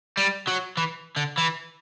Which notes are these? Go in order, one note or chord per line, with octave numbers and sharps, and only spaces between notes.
G3
F#3
E3
D3
E3